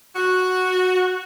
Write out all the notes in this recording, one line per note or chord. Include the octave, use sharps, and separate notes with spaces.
F#4